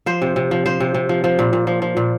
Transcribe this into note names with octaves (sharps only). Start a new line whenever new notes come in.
F3 C5
C3
C3
F3
F3 C5
C3
C3
F3
F3
A#2
A#2
F3
F3
A#2